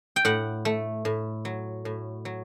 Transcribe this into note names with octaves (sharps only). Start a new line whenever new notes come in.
G5
A2 F#5
A3
A2
F#3
A2
F#3